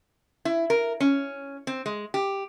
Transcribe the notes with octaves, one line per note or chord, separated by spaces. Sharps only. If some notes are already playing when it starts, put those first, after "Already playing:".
E4
A#4
C#4
C4
G#3
G4